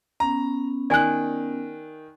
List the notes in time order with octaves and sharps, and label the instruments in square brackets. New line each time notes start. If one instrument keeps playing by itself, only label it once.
[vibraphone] B3 C#4 [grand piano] A#5
[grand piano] D#3 F#6 [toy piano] D5 G#5